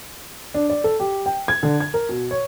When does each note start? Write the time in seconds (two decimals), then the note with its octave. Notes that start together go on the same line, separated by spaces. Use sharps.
0.54 D4
0.70 D5
0.84 A4
1.00 G4
1.26 G5
1.48 G#6
1.63 D3
1.80 G#6
1.94 A#4
2.09 B2
2.31 C#5